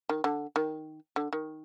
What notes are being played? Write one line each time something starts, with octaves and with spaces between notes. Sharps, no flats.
D#3
D3
D#3
D3
D#3